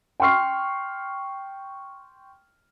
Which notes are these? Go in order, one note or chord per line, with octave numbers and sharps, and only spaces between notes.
G5 C6 C#6 F6 C7